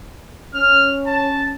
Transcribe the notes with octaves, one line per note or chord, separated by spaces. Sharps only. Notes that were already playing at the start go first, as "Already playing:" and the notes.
C#4 F6
A5